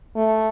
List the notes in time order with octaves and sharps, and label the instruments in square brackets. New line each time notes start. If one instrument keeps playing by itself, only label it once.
[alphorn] A3